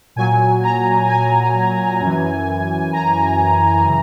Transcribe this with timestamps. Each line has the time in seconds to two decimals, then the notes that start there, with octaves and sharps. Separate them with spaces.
0.16 A#2 F#3 G#5
0.63 A#5
1.08 G#5
2.00 F#2 E3
2.93 A#5
3.85 C#3 E3